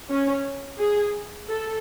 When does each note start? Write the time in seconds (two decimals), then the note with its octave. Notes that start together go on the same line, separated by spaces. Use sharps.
0.10 C#4
0.79 G#4
1.49 A4